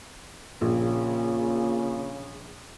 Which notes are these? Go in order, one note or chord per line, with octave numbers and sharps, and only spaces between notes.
A#1 A#2 C#3